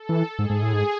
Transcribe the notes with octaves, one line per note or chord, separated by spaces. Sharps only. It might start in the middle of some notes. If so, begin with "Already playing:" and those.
Already playing: A4
E3
G#2 G#4
G#2
A2
G#2